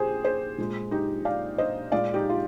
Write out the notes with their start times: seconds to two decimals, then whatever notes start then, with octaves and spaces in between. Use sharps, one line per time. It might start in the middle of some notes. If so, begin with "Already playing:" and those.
Already playing: A#2 G4 G#4 C5
0.25 G#4 C5
0.58 A#2 G#3
0.91 D#4 G4
1.25 D5 F5
1.58 C5 D#5
1.92 A#2 G#3 D5 F5
2.14 D#4 G4
2.30 F4